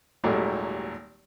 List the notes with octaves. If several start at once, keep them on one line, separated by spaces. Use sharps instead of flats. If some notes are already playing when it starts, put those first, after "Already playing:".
G#1 D#2 A#2 F#3 G3 A3